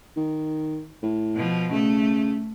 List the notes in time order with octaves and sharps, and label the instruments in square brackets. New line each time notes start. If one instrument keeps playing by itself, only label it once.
[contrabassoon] D#3
A2
[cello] B2 F3
[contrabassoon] C#3 [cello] A3